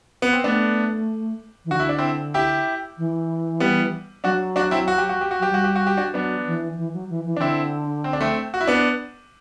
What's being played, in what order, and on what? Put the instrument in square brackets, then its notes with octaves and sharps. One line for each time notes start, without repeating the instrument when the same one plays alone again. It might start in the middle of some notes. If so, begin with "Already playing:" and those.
[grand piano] B3
C4
[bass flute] A3 [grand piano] B3 D4
[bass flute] E3
[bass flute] D3 [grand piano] F#4
[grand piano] E4
D4
C4 E4
E4 G4
[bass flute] E3
[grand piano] G3 B3
[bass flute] F#3 [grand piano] D4 F#4
[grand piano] D4 F#4
C4 E4
F#4
G4
F#4
G4
F#4
[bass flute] F#3 [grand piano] G4
[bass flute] G3 [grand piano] F#4
[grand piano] G4
F#4
G4
D4 F#4
[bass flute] F#3 [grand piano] B3 D4
[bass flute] E3
E3
F#3
E3
E3
[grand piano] D4
[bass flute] D3 [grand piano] C4 E4
[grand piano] C4
D4
A3 C4
F#4
E4
B3 D4